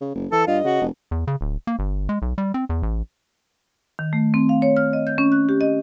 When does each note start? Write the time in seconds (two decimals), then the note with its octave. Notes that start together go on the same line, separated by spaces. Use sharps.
0.01 C#3
0.15 F#1
0.32 E3 A4 E6
0.47 G2 F4 D#5
0.64 C#3 F#4
0.81 F1
1.11 E2
1.27 C#3
1.41 D1
1.67 A#3
1.79 G1
2.09 G#3
2.22 B1
2.38 G3
2.54 C4
2.69 E2
2.83 A1
3.99 D#3
4.13 A3
4.34 C4
4.49 F5
4.62 C#5
4.77 F6
4.93 D#5
5.07 G6
5.18 C#4
5.32 F#6
5.49 G4
5.61 D#5